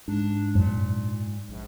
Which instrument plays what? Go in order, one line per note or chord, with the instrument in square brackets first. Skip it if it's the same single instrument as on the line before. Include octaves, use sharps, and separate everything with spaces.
[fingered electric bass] G#2 [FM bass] D4
[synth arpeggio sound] F#2 [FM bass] A#2
[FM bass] A#1